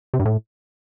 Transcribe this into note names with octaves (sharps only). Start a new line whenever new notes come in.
C3
G2
A2